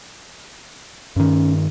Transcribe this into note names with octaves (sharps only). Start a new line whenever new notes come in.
G2 D#3 C#4